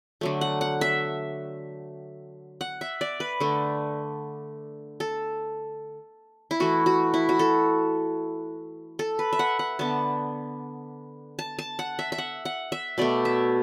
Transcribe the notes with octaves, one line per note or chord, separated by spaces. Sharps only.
D3 F#3 A3
F#5
F#5
E5
F#5
E5
D5
B4
D3 A3
A4
E4
E3 A3 F#4
F#4
E4
F#4
A4
A4
B4
E5
F#5
F#5
D3 B3 A5
A5
A5
F#5
E5
E5
F#5
F#5
E5
B2 A3 D5
E5